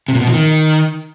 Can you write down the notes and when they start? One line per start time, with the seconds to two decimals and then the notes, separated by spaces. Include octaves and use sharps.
0.08 C3
0.15 A#2
0.21 B2
0.27 F3
0.34 D#3